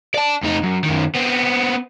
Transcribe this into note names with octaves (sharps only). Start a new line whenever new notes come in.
D5 A5
F2 D#4
F#2
F#2 D#3
B3 C4